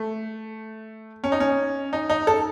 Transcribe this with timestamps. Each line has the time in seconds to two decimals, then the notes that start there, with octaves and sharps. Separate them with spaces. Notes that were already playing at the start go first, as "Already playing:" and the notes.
Already playing: A3
1.24 C#4
1.32 D#4
1.40 C#4
1.93 D#4
2.10 D#4
2.27 A4